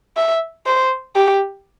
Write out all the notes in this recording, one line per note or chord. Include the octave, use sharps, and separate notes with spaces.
E5
C5
G4